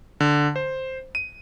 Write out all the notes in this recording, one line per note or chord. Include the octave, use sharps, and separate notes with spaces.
D3
C5
D#7